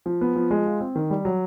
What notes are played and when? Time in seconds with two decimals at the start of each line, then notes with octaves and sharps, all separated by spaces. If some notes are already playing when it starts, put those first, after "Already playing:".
0.06 F3
0.21 B3
0.36 F3
0.51 G#3
0.66 F4
0.81 C4
0.96 D#3
1.10 G3
1.25 F#3